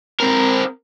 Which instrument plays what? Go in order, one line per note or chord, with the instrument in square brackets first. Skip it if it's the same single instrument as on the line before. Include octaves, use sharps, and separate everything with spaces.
[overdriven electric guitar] C4 A#4